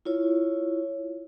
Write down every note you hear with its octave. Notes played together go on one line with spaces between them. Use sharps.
E4 F4 C#5